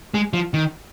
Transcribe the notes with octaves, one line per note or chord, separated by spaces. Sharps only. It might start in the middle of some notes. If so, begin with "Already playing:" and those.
G#3
F3
D#3